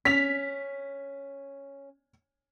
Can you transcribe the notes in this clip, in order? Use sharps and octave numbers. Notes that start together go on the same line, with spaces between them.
C#4 B6 F7